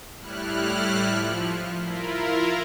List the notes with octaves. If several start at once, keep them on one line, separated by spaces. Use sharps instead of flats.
A2 G3 E4 F6 F#6
F3
E4 F4 A#4